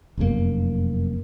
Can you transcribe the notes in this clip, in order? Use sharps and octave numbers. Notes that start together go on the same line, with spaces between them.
F1 F#2 B2 A#3